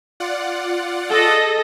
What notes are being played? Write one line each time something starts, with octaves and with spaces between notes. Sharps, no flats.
F4 D5 F#5
G#4 A4 D#5